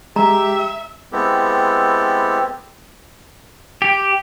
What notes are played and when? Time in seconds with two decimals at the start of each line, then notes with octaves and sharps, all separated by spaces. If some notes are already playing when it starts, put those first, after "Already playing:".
0.16 G#3 G4 E5 A#5
1.12 G#3 B3 C4 E4 G4 A4
3.82 G4